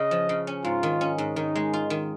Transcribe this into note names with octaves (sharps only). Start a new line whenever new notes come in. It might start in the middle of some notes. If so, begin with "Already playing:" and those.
Already playing: C#3 D#5
F3
C#3
C#4
G#2 F4
D#3
C#4
G#2
D#3 D#4
G#3
F4
D#3